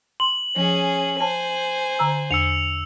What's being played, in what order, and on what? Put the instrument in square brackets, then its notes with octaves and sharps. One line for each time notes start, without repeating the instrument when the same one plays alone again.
[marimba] C6 [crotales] F#7
[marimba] F3 G#5 [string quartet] C#4 G#4
[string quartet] C5 G#5 [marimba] A5
[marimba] D3 A#5 E6
[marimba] E2 [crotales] E6 C#7 F7